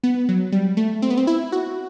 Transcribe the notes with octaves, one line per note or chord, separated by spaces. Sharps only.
B3
F#3
G3
A3
C4
B3
C4
E4
F#4